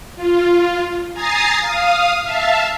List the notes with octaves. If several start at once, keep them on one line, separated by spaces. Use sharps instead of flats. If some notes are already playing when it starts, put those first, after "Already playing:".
F4
G#5 A#5 D#6 A6 C7
F5 D#6
E5 F5 A5